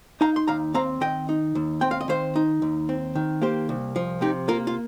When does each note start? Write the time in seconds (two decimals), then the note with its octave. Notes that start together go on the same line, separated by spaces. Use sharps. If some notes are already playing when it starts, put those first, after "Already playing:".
0.21 D#4 F5 A#5
0.36 C6
0.48 D#2 F5 A#5
0.74 C4 F5 A#5
1.01 D#3 D#5 G5
1.29 D#4
1.55 D#2
1.81 C4 G5
1.91 F5
2.01 D#5
2.08 D#3 C5 F5
2.36 D#4
2.62 D#2
2.89 C4
3.15 D#3
3.42 A#3 G4 C5
3.69 C2
3.96 F3
4.21 C3 D#4 G4
4.48 A#3 F4 A#4
4.67 F4